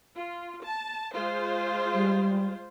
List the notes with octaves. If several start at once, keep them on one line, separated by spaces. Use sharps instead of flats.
F4
A5
G#3 F4 C5
G3